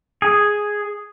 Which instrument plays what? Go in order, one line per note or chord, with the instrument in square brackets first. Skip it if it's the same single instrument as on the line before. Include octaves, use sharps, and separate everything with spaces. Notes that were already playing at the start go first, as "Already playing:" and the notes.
[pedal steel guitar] G#4